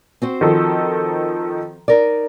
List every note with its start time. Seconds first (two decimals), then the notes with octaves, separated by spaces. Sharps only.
0.22 C4 F#4 C5
0.41 D#3 F3 A4
1.88 D#4 A#4 D5